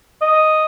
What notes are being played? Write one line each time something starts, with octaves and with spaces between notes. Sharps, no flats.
D#5